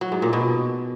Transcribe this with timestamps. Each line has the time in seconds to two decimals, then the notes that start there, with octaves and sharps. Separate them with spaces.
0.01 F#3
0.12 G#2
0.22 A#2
0.33 B2